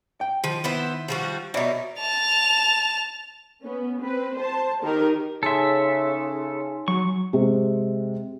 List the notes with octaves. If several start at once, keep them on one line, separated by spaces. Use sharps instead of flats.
G5
D#3 F3
B3 E4 C5
F3 G3 F#4
B2 D#4 C#5 D5 E5
A5 F7
B3 C#4
C4 B4
C5 A5
D#3 D#4 G4 A#4
C#3 D#4 A4 E5 G#5 C6
F#3 C#6
C3 G#3